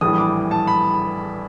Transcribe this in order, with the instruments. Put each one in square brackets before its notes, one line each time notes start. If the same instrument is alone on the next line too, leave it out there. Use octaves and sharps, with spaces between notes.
[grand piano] A#1 A2 E3 G3 D#6
D6
A5
B5